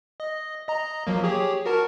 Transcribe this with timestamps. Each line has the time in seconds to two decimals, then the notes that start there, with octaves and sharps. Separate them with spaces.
0.20 D#5
0.68 D#5 A#5
1.07 F3 F#3 A#3
1.24 G4 G#4 C#5
1.65 F#4 A#4 A5